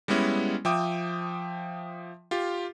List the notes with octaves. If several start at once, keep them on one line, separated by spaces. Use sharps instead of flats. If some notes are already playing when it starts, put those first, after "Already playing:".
G3 G#3 B3 C#4 E4
F3 E5 G5 D6 D#6
F4 G4